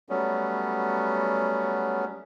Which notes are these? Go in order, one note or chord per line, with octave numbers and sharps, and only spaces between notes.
F#3 G3 A3 B3 C#4